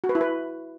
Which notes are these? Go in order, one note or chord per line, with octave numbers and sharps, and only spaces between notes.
F#4
B4
E4
B4